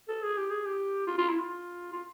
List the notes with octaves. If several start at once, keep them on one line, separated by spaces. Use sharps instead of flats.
A4
G#4
G4
G#4
G4
F4
F4
E4
F4
F4